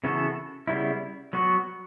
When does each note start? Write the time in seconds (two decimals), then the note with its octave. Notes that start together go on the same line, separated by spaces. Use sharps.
0.04 C#3 E3 B3 F#4 A4
0.67 C#3 G3 B3 E4
1.33 F#3 B3 F#4